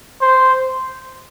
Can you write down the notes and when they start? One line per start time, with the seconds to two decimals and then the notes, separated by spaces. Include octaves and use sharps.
0.22 C5